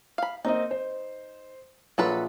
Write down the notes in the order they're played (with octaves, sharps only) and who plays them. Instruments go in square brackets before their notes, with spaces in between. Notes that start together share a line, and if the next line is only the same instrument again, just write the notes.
[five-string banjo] F5 B5
[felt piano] A#3 C4 D#5 [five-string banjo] D#4
[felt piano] C5
[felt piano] A#1 F4 [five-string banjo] F#3 A4 B4